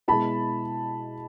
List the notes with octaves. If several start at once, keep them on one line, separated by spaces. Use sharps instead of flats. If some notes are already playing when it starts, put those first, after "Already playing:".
B2 G#3 B3 E4 A5 B5